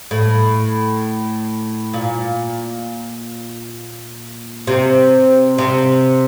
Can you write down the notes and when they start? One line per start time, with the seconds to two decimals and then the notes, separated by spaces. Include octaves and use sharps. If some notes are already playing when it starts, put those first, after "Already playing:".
0.11 A2
1.93 A#2
4.67 C3
5.58 C3